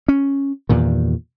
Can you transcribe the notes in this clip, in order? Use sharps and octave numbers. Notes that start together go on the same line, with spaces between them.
C#4
E2 G2 A#2 D#3